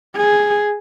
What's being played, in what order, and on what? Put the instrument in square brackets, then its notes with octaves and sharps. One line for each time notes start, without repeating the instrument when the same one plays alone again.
[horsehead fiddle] G#4